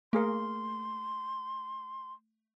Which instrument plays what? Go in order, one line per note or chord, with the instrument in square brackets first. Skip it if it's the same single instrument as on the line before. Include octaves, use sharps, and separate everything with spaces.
[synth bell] A3 [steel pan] A#3 G#4 A#4 [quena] C6